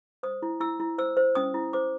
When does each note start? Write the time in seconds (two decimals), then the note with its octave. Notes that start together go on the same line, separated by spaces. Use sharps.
0.23 C5 D#6
0.42 E4
0.60 E4 E6
0.80 E4
0.98 C5 E6
1.17 C5
1.35 C#4 D#6
1.54 E4
1.73 C5 D6